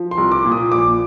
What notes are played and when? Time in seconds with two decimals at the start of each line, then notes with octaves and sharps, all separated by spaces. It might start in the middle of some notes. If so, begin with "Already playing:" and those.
Already playing: F3
0.11 C6
0.18 C2
0.32 D6
0.45 A#2
0.52 D#6
0.72 A#1 D6